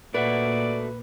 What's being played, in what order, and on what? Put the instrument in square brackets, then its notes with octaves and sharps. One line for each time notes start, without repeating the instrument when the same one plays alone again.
[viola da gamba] A#2 [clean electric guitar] A3 F#4 [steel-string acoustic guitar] B4 [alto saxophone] D5